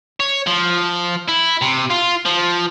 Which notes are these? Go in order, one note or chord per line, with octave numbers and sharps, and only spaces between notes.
C#5
F3
E4
C3
F4
F3